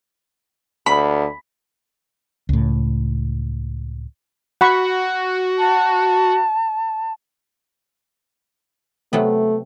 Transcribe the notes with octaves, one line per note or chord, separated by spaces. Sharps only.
D2 B5
C#2 A2
F#4 F#5 B5 C#6
A5
C3 F#3 A3 B3